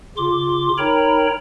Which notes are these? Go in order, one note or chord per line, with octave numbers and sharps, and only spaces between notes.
C#3 F4 C6 D6
D#4 A#4 C#5 G5 A#5 B5